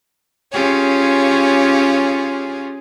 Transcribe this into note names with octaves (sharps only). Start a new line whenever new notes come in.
C#4 F4 G4 G#4 C#5